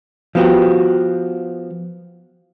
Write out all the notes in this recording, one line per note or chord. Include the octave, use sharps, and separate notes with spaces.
F3 B3 F#4 G4